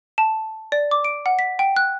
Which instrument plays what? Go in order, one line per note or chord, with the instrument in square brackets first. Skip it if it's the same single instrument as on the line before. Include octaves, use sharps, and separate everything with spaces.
[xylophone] A5
D5
D6
D7
F#5
B6
G5
F#6